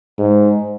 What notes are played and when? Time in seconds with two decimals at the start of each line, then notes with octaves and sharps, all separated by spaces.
0.19 G#2